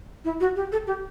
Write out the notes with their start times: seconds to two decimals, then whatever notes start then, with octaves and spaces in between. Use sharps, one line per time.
0.25 E4
0.40 F#4
0.56 G4
0.72 A4
0.87 G4